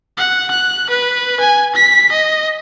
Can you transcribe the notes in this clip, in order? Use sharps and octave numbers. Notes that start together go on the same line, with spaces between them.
F#5
F#6
B4
G#5
B6
D#5